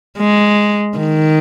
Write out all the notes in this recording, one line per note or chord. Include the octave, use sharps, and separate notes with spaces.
G#3
D#3